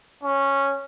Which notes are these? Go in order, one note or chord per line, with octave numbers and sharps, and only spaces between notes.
C#4